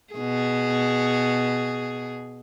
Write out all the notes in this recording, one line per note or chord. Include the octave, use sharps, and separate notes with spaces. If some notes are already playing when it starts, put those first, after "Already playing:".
B2 G#4